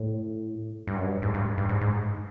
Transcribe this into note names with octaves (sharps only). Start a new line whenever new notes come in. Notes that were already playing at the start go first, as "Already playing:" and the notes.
Already playing: A2
G2
F#2
G2
G#2
G2
G2
G#2
G#2